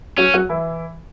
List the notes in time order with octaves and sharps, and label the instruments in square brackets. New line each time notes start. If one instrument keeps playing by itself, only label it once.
[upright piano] F#3 F#4 [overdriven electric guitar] C#4
[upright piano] F#3 F#4
E3 E4